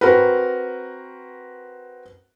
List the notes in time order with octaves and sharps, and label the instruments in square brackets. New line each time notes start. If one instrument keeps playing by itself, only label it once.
[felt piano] C4 F#4 A#4 B4